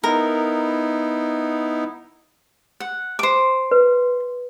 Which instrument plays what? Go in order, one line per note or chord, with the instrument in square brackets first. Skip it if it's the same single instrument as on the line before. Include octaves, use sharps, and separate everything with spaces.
[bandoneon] B3 D#4 E4 [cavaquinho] A#4
[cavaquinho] F#5
C5 D6
[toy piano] B4